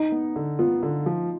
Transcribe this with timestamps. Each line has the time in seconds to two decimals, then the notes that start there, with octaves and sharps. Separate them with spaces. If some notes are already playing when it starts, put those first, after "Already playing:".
Already playing: D#4
0.12 B3
0.36 D3
0.59 B3 F4
0.83 D3
1.06 F3